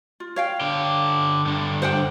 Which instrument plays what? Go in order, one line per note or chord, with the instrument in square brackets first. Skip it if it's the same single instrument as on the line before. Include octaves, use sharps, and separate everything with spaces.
[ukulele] F4
C#5 F5 G5
[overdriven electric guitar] D3 G4
G2 D3
[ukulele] C5 F#5 G5